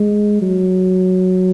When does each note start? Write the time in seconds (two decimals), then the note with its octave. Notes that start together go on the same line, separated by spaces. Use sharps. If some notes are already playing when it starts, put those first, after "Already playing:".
Already playing: G#3
0.42 F#3